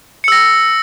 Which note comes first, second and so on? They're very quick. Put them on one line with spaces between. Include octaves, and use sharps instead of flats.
C#7 E6 A#6